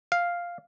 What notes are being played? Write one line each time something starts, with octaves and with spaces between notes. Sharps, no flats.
F5